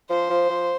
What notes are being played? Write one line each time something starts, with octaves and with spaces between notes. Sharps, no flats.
F3 C5
F3
F3